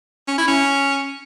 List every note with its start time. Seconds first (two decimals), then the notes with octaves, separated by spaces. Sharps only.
0.28 C#4
0.38 E4
0.48 C#4